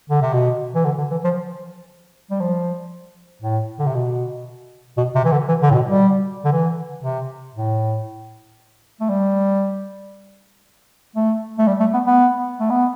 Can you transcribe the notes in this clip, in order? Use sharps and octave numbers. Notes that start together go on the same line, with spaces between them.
D3
C3
B2
E3
D3
D3
E3
F3
G3
F3
A2
D3
C3
B2
B2
C3
E3
D3
E3
D3
A2
B2
G3
D3
E3
C3
A2
A3
G3
A3
A3
G3
A3
B3
B3
A3
B3